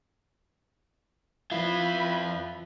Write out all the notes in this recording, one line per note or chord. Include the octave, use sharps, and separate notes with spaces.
F2 F3 E4 F4 B4 F5 B5